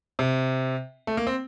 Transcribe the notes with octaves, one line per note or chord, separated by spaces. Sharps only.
C3
A3
A#3
C4